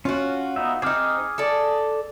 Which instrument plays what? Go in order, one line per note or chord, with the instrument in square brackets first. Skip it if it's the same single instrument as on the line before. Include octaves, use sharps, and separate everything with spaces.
[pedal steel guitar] C#4 [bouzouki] F4 F#4
[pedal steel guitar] B3 D#4 E5
[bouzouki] C4 D#4 [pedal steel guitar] G#4 D6 F6
[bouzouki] A4 D5